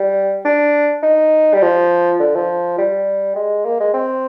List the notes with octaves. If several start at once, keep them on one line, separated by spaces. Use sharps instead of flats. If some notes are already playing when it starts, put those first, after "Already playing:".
Already playing: G3
D4
D#4
G3
F3
D3
F3
G3
G#3
A#3
G#3
C4